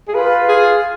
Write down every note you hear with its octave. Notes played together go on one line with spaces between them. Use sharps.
G#4
F4 B4
G#4